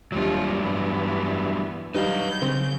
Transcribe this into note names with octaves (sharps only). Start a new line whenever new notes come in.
D#2 C3 F#3 G3 D4 F4
G2 E3 B3
D#3 F#3 G3 D#4 B4 F5 G6
C#3 C4